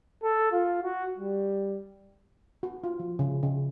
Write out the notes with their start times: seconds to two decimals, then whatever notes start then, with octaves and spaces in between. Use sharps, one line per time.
0.23 A4
0.51 F4
0.83 F#4
1.18 G3
2.63 F#4
2.84 F4
3.00 F3
3.19 C#3
3.43 C#3